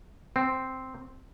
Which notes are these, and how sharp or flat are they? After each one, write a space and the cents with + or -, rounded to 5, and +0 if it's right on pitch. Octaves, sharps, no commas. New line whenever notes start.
C4 -5